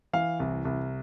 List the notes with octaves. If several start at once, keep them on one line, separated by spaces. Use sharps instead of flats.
E3 F5
C2
C2